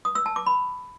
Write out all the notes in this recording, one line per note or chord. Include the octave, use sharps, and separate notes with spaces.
D#6
E6
A5
D6
B5